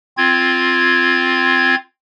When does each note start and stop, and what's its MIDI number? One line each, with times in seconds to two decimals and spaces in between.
0.17 1.75 60
0.17 1.75 65
0.17 1.75 92